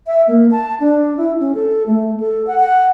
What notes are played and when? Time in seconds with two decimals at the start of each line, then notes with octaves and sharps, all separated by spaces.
0.07 E5
0.28 A#3
0.51 A5
0.80 D4
1.17 E4
1.40 C#4
1.55 A4
1.86 A3
2.20 A4
2.47 F#5
2.60 F#5